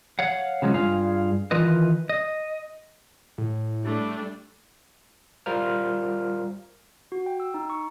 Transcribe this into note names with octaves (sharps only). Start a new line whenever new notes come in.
C#5 F5 F#5
C#3 F3 F#3 G#3 C#4
G2 F4 G#4 F5
D#3 E3 F4 B4 D#5
D#5
A2
G3 A3 D4
G3 F4 A#4 C5 F6
F#4
G5
E6
D#4
C#6